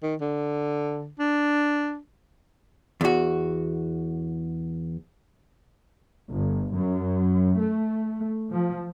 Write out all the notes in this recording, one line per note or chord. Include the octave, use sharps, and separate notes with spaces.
D#3
D3
D4
E2 F#4
G1
F#2
A3
F3